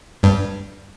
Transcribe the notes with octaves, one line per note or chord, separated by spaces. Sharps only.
G2